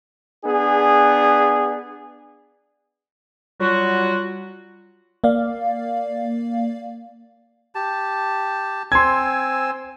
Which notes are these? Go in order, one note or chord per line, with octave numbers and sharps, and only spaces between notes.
B3 D4 G#4
F#3 G3 F4 F#4
A#3 D5 F5
G4 A5
C4 G#5 C6 E6 G#6